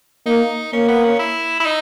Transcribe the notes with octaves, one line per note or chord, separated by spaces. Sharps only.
A#3 D#4
A#3 C#4
B3
C#4
E4
E4
D#4